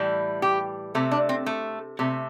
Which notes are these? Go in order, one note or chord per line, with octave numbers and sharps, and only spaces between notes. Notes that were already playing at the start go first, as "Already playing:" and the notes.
Already playing: A2 E3 G3
G4
C3 A3
D4
C4
A3
C3 A3